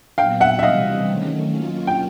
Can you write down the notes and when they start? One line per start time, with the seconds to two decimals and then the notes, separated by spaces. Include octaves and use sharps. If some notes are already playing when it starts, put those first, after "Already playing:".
0.18 A#2 F#3 B3 F5 G5
0.40 E5 F#5
0.59 E5
0.63 C3 E3 G3 C4 D#5 F5
1.08 D#3 F#3 A3 C#4
1.54 F#3 A#3 C#4 F4
1.87 G5